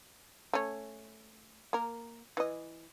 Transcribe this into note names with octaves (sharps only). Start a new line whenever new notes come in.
A3 C#4
A#3 A#4
E3 D#5